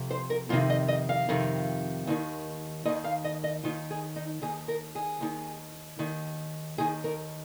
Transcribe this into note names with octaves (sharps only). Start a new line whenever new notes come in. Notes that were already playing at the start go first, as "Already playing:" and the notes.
Already playing: F2 C3
C5
A#4
F2 C3 D#3 F4
D#5
D#5
F5
F2 C3 D#3
D#2 D#3
D#2 D#3 D#5
F5
D#5
D#5
D#2 D#3 F4
G#4
D#4
D#2 D#3 G#4
A#4
G#4
D#2 D#3
D#2 D#3
D#2 D#3 G#4
A#4